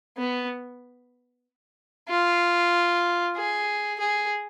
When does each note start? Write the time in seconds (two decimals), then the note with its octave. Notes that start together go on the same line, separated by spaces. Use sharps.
0.17 B3
2.09 F4
3.36 G#4
4.00 G#4